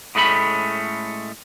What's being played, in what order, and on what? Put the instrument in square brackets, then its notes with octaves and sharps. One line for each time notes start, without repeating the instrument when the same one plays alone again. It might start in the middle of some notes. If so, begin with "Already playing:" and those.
[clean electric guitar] A2 G#3 A3 C#4 B5